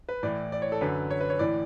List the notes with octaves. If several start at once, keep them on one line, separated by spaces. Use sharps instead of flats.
B4
A2 E3 D5
D5
C#5
A4
F#2 D3 B4
C#5
B4
C#5
A2 E3 D5